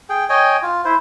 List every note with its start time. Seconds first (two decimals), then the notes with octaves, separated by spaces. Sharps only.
0.09 G#4 G5
0.29 C#5 D#5 G5 G#5
0.63 F4
0.85 E4 C5